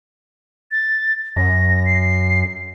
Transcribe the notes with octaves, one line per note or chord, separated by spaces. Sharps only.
A6
F#2 A#6
C7